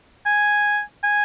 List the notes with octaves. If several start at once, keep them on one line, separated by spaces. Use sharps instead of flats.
G#5
G#5